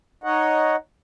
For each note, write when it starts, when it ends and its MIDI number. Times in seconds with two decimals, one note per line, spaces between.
0.24 0.76 63
0.24 0.76 73
0.24 0.76 75
0.24 0.76 78